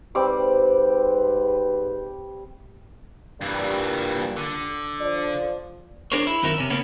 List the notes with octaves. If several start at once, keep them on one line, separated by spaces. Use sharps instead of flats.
G#2 G3 C4 G4 B4 D6
G2 A#2 E3 G3
D3
F3 D5
D4 G#4 A#4 C5 C#5
E4
F#2 D#3 C4 F#4 A#4 E5
C3 C#4
C#3 A#3 B3 C#4